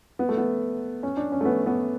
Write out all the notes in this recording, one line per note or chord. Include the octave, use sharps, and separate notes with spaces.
B3
A3
B3
C#4
D4
C#4
A3
B3
B3